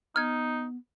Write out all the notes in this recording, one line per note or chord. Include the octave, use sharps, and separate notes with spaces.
B3 D#4 F6 G#6